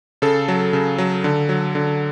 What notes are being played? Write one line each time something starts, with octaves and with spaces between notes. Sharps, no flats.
C#3 A4
F#3
C#3
F#3
D3
F#3
D3